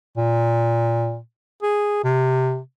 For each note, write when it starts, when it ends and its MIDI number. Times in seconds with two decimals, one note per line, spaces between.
0.17 1.19 46
1.62 2.03 68
2.04 2.59 48